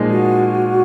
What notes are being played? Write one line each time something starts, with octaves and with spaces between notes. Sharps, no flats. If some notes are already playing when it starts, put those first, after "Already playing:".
Already playing: A#2 F3 G#3 D#4
F#4